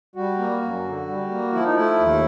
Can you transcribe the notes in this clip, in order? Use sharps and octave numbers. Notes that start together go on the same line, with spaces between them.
G3 F#4
A#3
F#2
D3
G3
A#3
F3 E4
D#4
A3 E4
D#2